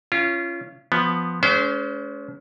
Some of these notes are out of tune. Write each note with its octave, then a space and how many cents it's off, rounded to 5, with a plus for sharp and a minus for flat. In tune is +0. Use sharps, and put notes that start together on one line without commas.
C#4 +0 F4 -30
F3 +0 B3 +0
G#3 +45 C#4 +35 C5 -25